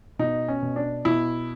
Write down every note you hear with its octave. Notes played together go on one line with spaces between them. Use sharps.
B2 D#4
C#4
B2
D4
B2 E4